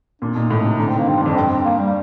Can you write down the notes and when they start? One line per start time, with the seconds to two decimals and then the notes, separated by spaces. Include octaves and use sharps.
0.21 A#2 D4
0.35 A#2 D#4
0.50 A2
0.64 C3
0.78 D3 D4
0.89 D#3 C4
0.98 A#3
1.07 G2 C4
1.17 G2
1.22 F2 D4
1.35 G2 C4
1.65 A#3
1.79 G3